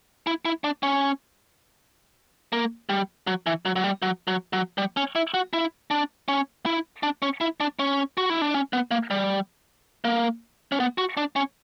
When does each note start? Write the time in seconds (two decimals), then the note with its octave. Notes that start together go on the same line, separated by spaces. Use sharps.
0.27 E4
0.45 E4
0.64 D4
0.83 C#4
2.53 A#3
2.89 G3
3.27 F#3
3.46 E3
3.65 F#3
3.76 F#3
3.84 G3
4.02 F#3
4.28 F#3
4.53 F#3
4.78 G3
4.97 C#4
5.16 E4
5.34 F#4
5.53 E4
5.91 D4
6.28 C#4
6.66 E4
7.03 D4
7.22 C#4
7.41 E4
7.60 D4
7.79 C#4
8.18 F#4
8.30 E4
8.42 D4
8.54 C#4
8.73 B3
8.91 A#3
9.11 G3
10.05 A#3
10.72 C#4
10.80 B3
10.98 F#4
11.17 D4
11.36 C#4